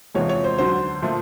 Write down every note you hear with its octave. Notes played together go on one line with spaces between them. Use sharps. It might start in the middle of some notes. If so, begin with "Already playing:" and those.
E2 C3 F3 G#3 C#5
C#5
C5
D2 D3 F#3 C5
A#2 F3 A3